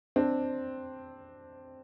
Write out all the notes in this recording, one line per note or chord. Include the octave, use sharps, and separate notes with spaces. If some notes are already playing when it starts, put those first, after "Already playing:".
C4 D4